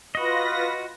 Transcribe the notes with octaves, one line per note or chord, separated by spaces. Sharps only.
F4 F#4 B4 D#5 A#6